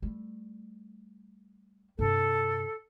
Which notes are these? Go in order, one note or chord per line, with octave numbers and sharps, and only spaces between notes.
G3 A3
G2 C3 A4